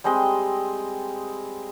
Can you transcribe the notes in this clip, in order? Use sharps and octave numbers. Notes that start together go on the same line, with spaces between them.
G3 G#3 C4 D#5